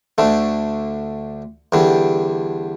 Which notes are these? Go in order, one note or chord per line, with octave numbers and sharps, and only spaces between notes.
D2 D3 A3
E2 D3 G3